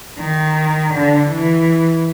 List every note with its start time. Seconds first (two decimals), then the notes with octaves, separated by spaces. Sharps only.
0.19 D#3
0.94 D3
1.31 E3